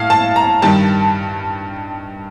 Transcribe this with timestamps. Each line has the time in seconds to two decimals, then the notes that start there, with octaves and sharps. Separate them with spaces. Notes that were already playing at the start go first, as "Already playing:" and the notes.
Already playing: A2 F5
0.10 A5
0.36 A#5
0.62 G2 D#3 G3 A5